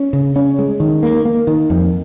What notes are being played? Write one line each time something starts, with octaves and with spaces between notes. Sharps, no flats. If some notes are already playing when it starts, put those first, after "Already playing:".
Already playing: C#4
C#3
C#4
G#3
D#3
A#3
A#3
D#3
F2